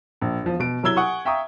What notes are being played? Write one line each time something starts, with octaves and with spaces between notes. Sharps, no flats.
A#1
E1 F3
B2 D7
C2 F#3 E4 E6 G#6 G7
F#5 G#5 C#6 D#6
E5 F5 G5 A#5 C#6 D#6